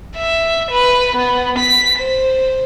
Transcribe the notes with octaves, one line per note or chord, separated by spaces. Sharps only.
E5
B4
B3
B6
C5